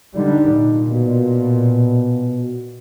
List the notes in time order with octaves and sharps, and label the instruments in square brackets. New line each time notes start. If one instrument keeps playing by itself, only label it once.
[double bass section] D3 G3 [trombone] D#4
[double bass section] A#2
[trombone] B2